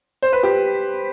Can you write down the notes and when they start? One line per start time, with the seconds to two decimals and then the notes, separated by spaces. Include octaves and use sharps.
0.22 C5
0.33 B4
0.43 G4